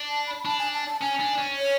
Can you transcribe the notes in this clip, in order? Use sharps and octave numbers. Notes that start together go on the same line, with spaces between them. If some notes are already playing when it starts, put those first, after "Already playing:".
Already playing: D4
A5
B5
D4 A5
G#5
A5
A5
C#4 G#5
D4
C#4
C#5